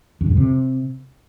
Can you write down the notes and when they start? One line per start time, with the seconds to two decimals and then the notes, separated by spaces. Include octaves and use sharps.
0.21 E2
0.26 G2
0.32 F2
0.37 C3